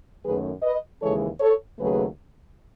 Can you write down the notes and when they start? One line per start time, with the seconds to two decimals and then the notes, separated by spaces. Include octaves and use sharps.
0.24 F#2 D#3 F#3 A3 G#4 B4
0.63 B4 D#5
1.01 D#2 C#3 E3 G#3 A4 C#5
1.40 A4 C#5
1.79 D#2 C#3 F#3 A3 G#4 B4